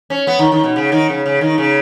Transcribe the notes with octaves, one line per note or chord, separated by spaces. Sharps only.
C#4
B3
D#3
D#3
B2
C#3
D#3
C#3
C#3
D#3
C#3